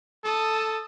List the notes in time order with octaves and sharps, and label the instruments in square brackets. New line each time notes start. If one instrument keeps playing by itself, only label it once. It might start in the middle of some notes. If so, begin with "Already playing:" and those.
[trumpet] A4 [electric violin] A5 D#6